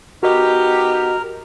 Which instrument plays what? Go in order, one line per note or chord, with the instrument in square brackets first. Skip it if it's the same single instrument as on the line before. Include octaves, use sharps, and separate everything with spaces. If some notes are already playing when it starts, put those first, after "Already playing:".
[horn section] B3 D#4 G4 [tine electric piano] F#4 D#5 [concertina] A#4